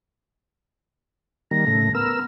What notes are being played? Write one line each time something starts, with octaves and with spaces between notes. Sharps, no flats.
D#3 G3 A#3 A#6
A2 C#3 A3
B3 A#4 E6 F6